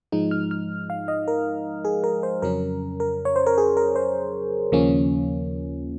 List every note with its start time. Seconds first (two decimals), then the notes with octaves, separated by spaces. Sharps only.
0.12 G#2 F3 G#3 D#4
0.31 F6
0.51 F6
0.90 F5
1.08 D#5
1.28 A#4
1.85 G#4
2.04 A#4
2.23 C5
2.42 F2 C#3 F#3 C#4 A#4
3.00 A#4
3.25 C#5
3.36 C5
3.46 A#4
3.58 G#4
3.77 A#4
3.96 C5
4.72 D#2 C#3 F3 A#3 C#4